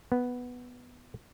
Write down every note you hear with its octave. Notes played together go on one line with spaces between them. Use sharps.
B3